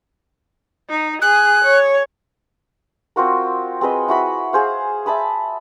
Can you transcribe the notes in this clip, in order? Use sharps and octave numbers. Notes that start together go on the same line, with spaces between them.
D#4
G#4 F#6
C#5
C4 F4 F#4 A#4
C4 G#4 B4 D#5
E4 F#4 B5
G#4 C5 F5
E5 A5 B5 D#6